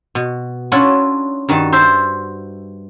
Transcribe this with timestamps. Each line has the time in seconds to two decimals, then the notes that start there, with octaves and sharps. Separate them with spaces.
0.15 B2
0.72 C#4 D4 E4 F4 F#5 G#5
1.49 G2 D#3 F#4 A5
1.72 C5 E5 A5